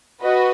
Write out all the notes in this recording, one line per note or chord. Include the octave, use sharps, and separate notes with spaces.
F#4 B4 D#5